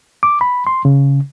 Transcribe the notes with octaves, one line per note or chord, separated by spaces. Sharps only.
D6
B5
C6
C#3